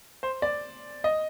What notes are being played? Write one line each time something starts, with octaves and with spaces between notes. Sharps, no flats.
C5
D5
D#5